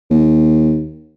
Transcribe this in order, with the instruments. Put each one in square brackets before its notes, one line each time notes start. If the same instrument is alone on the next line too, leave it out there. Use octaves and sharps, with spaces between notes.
[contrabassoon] D#2